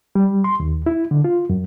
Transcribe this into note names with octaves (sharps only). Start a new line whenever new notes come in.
G3
C6
D#2
E4
D3
F4
F#2